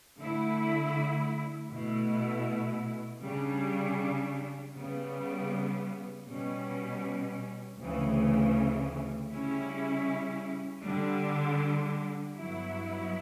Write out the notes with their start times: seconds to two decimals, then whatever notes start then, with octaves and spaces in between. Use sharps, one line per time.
0.18 D3 A3 E4
1.71 B2 A3 E4
3.22 C#3 G3 D4
4.74 C#3 G3 B3
6.26 B2 G3 C#4
7.78 D2 C#3 E3
9.30 C#3 G3 C#4 E4
10.82 D3 G3 D4
12.34 G2 F#3 B3 E4